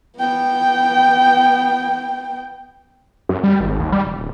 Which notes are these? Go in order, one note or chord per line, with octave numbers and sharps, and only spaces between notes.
B3 G5
F#2
G3
G#1
D#2
G3
E1
D1